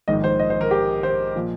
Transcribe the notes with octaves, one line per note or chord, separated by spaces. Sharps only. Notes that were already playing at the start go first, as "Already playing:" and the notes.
A#1 G#2 D#3 D#5
C5
D#5
C5
A#4
G4
C5
A#2 F3